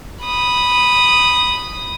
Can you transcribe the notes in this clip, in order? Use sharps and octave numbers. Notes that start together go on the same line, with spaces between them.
B5 D#6